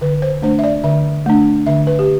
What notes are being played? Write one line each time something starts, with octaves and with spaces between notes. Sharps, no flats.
D3 B4
C5
A3 D4 C5
E5
D5
D3 E5
A3 D4
D3 E5
B4
G4